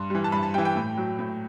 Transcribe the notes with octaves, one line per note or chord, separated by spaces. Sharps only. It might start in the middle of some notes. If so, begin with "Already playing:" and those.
Already playing: G2 C6
E3 G3
A5
G2 B5
A5
E3 G3 G5
G5
A2
F#3
A2